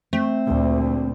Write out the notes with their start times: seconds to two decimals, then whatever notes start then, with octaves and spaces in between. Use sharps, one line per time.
0.13 A3 C4
0.47 D2 A#2